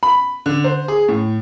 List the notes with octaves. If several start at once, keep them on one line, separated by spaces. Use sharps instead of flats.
B5
D3
C5
G#4
A2